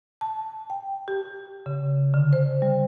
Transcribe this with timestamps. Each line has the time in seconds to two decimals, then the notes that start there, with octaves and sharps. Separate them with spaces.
0.21 A5
0.70 G5
1.08 G4
1.66 C#3
2.14 D3
2.33 C5
2.62 G3